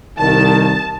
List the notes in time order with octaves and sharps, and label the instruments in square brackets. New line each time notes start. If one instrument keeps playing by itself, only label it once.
[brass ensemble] C2 D#3 [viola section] A5